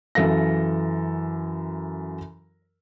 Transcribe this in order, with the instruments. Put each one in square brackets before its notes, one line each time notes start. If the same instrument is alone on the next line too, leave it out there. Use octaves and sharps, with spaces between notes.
[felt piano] F#2 E3 A4 F5 A#6